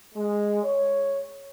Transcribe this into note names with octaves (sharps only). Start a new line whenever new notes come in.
G#3
C#5